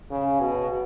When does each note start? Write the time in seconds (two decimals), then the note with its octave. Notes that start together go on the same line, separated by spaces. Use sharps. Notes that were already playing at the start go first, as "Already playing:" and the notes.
0.10 C#3
0.40 B2